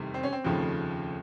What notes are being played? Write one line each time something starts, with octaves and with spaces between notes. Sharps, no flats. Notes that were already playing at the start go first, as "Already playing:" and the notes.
Already playing: F1 E2 C3 D#3 G3
C4
C#4
C4
F1 D#2 C#3 F3 A3